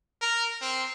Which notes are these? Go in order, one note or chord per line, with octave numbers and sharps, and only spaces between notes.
A#4
C4